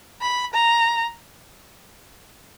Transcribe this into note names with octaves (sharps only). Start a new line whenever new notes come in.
B5
A#5